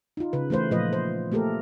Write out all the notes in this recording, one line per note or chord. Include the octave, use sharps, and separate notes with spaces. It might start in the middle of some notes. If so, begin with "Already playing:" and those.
D#4 F4
C#3 B4
E3 A3 B4 C5
A#2 F3 A3 F4 B4 D#5
C5
A3 A#3 G4 A4 A#4